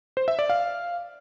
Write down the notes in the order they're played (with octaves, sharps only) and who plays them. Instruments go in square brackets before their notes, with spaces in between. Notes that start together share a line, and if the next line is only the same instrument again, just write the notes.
[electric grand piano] C5
E5
D5
F5